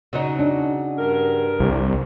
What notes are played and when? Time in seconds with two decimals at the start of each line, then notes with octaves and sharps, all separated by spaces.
0.13 C#3 F#3 D#4
0.39 D4
0.99 G2 A#4
1.60 C2